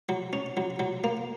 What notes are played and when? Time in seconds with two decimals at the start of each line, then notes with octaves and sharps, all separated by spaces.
0.09 F#3
0.33 C#4
0.57 F#3
0.79 F#3
1.04 A#3